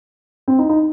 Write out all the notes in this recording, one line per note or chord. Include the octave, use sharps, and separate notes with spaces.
C4
D#4
D#4